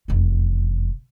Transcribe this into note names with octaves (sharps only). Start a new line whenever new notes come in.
F1 E2